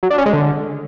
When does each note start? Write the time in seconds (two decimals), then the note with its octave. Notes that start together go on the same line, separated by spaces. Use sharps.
0.03 F#3
0.10 D4
0.18 C#4
0.26 G#3
0.33 D3